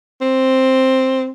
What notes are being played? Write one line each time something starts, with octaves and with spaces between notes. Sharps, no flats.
C4